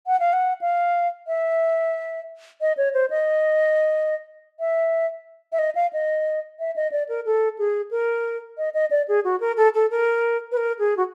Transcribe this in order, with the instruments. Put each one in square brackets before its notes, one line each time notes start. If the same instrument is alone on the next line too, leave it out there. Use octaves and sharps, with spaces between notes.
[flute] F#5
F5
F#5
F5
E5
D#5
C#5
C5
D#5
E5
E5
D#5
F5
D#5
E5
D#5
D5
A#4
A4
G#4
A#4
D#5
D#5
D5
G#4
F#4
A#4
A4
A4
A#4
B4
A#4
G#4
F#4